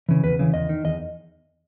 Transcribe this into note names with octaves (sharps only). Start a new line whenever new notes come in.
C#3 E3
E2 B4
C#3 E3
E2 D#5
D#3
E2 D#5